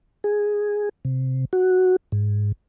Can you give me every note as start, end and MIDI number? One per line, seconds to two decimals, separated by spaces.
0.24 0.89 68
1.05 1.45 48
1.53 1.96 66
2.12 2.52 44